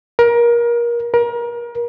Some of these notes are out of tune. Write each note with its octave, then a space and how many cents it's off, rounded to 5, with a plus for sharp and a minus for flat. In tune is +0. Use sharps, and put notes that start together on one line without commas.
A#4 +25
A#4 +30